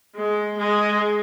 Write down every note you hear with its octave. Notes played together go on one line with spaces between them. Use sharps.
G#3
G#3